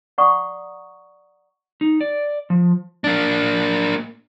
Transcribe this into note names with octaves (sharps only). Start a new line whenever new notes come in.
D5 F#5 A#5 C#6 D#6
D#4
D5
F3
A#3 D4